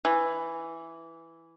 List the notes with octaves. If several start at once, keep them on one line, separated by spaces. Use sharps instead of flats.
E3